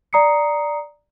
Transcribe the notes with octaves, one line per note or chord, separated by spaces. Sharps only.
D5 A#5 D#6 C7 C#7